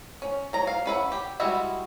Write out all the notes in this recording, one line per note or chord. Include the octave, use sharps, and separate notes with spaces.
C#4
F#3 A#5
F5
C#4 B4 E5 F#5
G4
G3 G#3 E4 F#4 E5